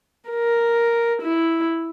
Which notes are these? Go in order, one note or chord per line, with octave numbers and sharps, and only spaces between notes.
A#4
E4